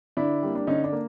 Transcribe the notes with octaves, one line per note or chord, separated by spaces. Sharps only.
D3 D4 E4
G3 A#3
D4
D3 C#4 D#4
D4
A#3